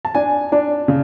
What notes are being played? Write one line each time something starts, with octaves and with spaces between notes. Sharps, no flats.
A5
D4 G#5
D4
C#3